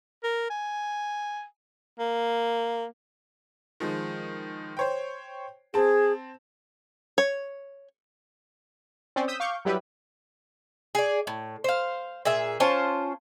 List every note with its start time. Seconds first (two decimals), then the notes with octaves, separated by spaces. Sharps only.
0.24 A#4
0.50 G#5
1.99 A#3
3.80 D#3 F3 G#3
4.77 C5 C#5 G5
5.74 C4 G#4 A5
7.18 C#5
9.16 C4 C#4 C5 D5
9.28 D#6 E6 G6 B6
9.40 F5 C#6 D6 G6
9.65 F#3 G3 E4 B4
10.95 G#4 D5
11.27 A2
11.64 C5 F5
12.25 A#2 G#4 E5
12.60 C#4 F4 C5 A5